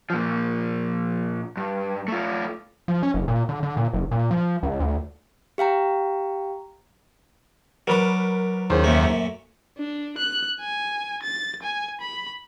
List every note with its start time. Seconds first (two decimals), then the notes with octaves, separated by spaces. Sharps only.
0.10 A#2 F3
1.57 G2
2.08 A3 F4
2.88 F3
3.03 C#4
3.14 F#1
3.28 A#2
3.49 D3
3.63 D3
3.77 A#2
3.93 F#1
4.11 A#2
4.31 F3
4.63 C#2
4.80 D2
5.58 G4 F5 G5 A#5
7.87 F#3 D4 A#4 B4 B5 D6
8.70 D#2 C#4 G#4 C5
8.84 F#2 A#2 A3
9.78 D4
10.18 F#6
10.61 G#5
11.23 A6
11.63 G#5
12.01 B5